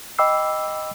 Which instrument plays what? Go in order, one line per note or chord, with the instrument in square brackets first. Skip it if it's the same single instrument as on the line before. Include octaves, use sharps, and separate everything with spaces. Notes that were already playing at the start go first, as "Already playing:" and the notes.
[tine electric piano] D#5 G5 B5 D6 E6 C7